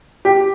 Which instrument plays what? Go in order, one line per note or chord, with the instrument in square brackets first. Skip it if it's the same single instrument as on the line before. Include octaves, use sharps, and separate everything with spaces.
[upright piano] G4